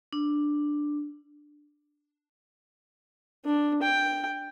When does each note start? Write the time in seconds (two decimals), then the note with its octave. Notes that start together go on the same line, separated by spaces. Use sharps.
0.13 D4
3.45 D4
3.83 G5